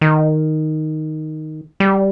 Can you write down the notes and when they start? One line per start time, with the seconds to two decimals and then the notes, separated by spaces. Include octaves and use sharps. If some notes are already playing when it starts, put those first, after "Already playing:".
0.01 D#3
1.80 G3